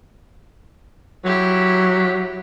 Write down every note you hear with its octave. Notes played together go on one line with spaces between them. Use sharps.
F#3 E4 G4